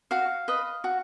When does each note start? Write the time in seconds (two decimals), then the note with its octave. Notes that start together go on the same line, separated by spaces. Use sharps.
0.11 F#4 F5
0.48 B4 D#5
0.84 F#4